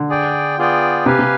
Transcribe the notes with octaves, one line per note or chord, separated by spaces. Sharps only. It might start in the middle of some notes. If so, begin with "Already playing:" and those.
Already playing: D3
G#4 D5 G5
B3 F4 G#4 D5 G5
C3 G4 B4 F5 G#5
C3